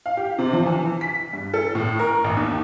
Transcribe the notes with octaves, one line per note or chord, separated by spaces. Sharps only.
F5
G4
C3
F3
E3
B6
G2
A4
A2
A#4
A1
D#2